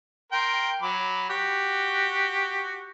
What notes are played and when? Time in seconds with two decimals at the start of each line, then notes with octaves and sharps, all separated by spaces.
0.32 A#4 G5 C6
0.82 F#3 B5 D6
1.30 F#4 G4